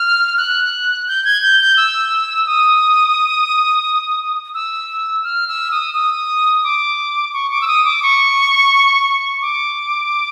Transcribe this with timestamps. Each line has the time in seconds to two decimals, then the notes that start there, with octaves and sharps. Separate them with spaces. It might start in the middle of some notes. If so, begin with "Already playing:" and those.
Already playing: F6
0.37 F#6
1.08 G6
1.25 G#6
1.42 G6
1.60 G6
1.77 E6
2.47 D#6
4.54 E6
5.24 F6
5.48 E6
5.71 D#6
5.94 D#6
6.64 D6
7.33 C#6
7.51 D6
7.61 E6
7.67 D#6
7.85 D6
8.03 C#6
9.42 D6